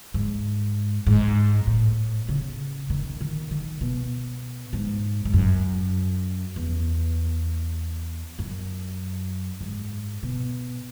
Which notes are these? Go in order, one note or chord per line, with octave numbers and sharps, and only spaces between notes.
G#2
G#2
A2
C#3
D#3
D#3
D#3
B2
G#2
G#2
F#2
E2
F#2
G#2
B2